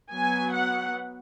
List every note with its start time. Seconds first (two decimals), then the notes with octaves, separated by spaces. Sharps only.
0.11 F#3 B3 G#5
0.52 F#5